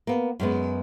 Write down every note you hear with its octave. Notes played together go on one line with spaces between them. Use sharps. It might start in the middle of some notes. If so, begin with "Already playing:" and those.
A#3 B3
F#2 G#3 B3